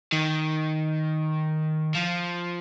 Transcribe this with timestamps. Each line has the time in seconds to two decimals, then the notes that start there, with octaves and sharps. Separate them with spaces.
0.12 D#3
1.95 F3